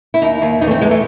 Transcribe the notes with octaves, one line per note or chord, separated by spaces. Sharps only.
E4
D#2 D#4
D#2
E2 D#4
A3
C4
E2 G#3
A3